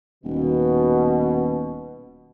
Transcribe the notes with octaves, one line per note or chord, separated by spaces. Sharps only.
D#1 B2